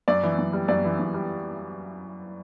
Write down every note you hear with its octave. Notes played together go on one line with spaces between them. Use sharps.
F#2 D5
E3
F#2
G3
F#2 D5
E3
F#2
G3